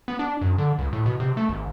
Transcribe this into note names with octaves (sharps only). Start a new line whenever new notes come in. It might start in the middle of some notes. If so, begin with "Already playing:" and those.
B3
D4
F#2
D3
C#2
A2
B2
C3
A3
G#1